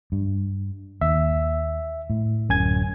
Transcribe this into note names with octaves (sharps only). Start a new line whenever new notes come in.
G2
D#2 E5
A2
D1 F#2 G#5 G#6